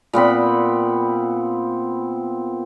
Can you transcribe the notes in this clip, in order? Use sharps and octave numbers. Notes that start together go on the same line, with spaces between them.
A#2 B3 C4 B5